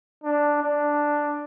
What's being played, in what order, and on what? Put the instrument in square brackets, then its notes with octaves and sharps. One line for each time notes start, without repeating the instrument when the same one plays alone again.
[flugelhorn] D4
D4